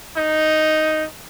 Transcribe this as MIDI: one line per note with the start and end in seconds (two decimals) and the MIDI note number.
0.17 1.05 63